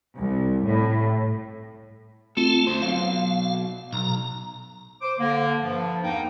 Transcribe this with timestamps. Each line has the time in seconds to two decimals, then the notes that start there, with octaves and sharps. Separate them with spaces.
0.17 C2
0.65 A2
2.37 A3 C4 F4 A4
2.67 D3 C5
2.82 B2 F#3 F5
3.93 B1 A#5
5.02 C5 D6
5.19 D3 A#3
5.62 G2 F3
6.03 E2 A#3 D#4 G5